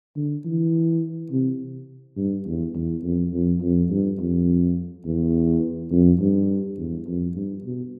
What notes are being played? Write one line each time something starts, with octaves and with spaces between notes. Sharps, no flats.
D3
E3
C3
G2
E2
E2
F2
F2
F2
G2
F2
E2
F2
G2
E2
F2
G2
B2